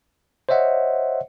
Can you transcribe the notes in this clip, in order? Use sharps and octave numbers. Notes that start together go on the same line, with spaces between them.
C5 C#5 D#5 E5 F#5